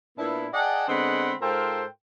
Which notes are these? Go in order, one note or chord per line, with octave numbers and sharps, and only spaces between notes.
A#2 B3 D4 E4
G#4 D5 D#5 F#5 G5 A5
D3 G#3 B3 C4 F#5 B5
G#2 F4 A4 A#4 C5 G5